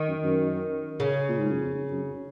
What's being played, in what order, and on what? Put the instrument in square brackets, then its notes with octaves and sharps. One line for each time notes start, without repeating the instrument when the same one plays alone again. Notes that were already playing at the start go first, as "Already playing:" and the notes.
Already playing: [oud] D#3
[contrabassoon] F#2
F#2
[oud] C#3
[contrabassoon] A#2
G#2
F#2
F2
F#2